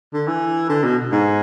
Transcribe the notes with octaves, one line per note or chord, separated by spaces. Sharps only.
D3
E3
D3
B2
G#2